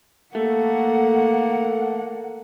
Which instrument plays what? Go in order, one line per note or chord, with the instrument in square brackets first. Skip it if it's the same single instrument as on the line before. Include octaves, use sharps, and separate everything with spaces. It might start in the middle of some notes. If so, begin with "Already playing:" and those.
[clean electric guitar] A3 [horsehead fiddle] A#3 F#5